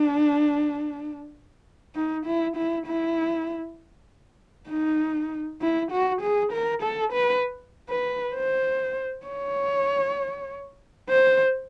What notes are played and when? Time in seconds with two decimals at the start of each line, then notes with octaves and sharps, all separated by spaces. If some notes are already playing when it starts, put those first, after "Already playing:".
Already playing: D4
1.95 D#4
2.26 E4
2.57 E4
2.87 E4
4.70 D#4
5.61 E4
5.91 F#4
6.22 G#4
6.52 A#4
6.83 A4
7.13 B4
7.89 B4
8.35 C5
9.26 C#5
11.09 C5